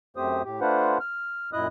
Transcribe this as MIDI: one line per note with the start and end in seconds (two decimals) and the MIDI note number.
0.17 0.42 42
0.17 0.42 57
0.17 0.42 60
0.17 0.42 67
0.17 0.42 72
0.17 0.42 87
0.44 0.60 45
0.44 0.60 67
0.61 0.98 57
0.61 0.98 62
0.61 0.98 65
0.61 0.98 71
0.61 0.98 72
0.61 0.98 78
1.00 1.50 89
1.53 1.67 42
1.53 1.67 46
1.53 1.67 64
1.53 1.67 75
1.53 1.67 87
1.53 1.67 90